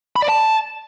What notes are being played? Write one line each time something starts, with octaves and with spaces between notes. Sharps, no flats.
B5
D5
A5